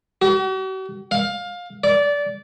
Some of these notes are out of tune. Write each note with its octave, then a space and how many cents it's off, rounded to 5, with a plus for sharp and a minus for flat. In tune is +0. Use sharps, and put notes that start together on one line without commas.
F#4 +45
F5 +20
D5 -20